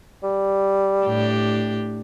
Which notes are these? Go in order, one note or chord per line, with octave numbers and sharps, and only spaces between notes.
G3
A2 D4 G4